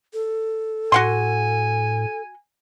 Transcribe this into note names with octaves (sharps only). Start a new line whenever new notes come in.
A4
A2 F#4 F#5 G#5 C6